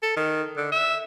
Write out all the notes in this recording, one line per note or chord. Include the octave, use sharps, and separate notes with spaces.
A4
D#3
D3
E5